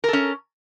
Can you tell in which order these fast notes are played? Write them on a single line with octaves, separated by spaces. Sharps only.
A#4 A4 C#4